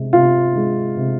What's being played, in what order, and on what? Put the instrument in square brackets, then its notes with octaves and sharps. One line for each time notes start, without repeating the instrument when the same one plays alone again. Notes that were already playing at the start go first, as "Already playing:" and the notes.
Already playing: [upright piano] C3 G#3
[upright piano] C3 [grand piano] F4
[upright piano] G#3
C3